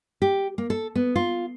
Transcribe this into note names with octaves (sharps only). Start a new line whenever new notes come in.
G4
A#3
A4
B3
F4